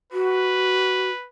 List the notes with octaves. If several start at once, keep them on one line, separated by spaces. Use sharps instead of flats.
F#4 B4